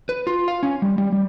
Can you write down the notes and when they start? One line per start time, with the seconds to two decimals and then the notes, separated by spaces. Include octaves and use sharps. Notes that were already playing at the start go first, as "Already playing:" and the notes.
0.09 B4
0.27 F4
0.48 F5
0.63 C#4
0.82 G3
0.98 G3
1.13 G3